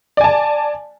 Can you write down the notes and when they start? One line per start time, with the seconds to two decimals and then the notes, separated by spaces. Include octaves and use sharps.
0.17 D5
0.21 G#5
0.24 A5